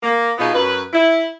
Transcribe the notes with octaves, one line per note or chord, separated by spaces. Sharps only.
A#3
B2 B3 D#4 F4 G#4
F#2 B4
E4